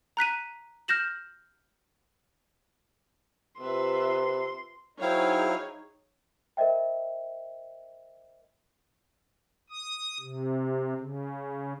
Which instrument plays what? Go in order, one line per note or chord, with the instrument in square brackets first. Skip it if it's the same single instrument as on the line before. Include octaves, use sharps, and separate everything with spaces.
[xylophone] A#5 F#6 B6 D#7
F6 G6 A#6 E7 F#7
[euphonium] C3 [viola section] F4 B4 E5 [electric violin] C6
[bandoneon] F#3 E4 F5 [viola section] D#4 G#4 C#5 [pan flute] C5 [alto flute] G5
[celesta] A#4 C5 D#5 E5 G5
[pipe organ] D#6
C3
C#3